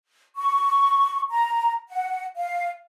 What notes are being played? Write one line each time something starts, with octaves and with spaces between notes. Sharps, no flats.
C#6
A#5
F#5
F5